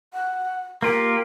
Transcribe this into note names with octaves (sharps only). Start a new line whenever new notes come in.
F#5
A#3 F4 G4 A#4